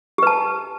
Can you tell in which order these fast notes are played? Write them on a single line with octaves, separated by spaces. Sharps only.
G4 B4 A5